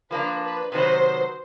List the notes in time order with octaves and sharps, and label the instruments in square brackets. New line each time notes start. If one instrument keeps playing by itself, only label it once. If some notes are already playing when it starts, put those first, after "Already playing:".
[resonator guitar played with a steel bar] F3 A#3 D4 [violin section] B4
[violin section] B4
[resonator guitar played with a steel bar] C3 D#3 F#3 B3 [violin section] C5